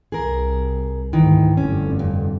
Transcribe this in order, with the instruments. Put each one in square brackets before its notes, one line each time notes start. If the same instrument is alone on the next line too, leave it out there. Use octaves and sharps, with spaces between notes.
[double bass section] C2 [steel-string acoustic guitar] G#4 A#4
[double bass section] D2 G#2 [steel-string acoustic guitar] D#3 E3
[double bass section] F1 G2 D3 [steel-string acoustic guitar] C#4
[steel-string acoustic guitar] F2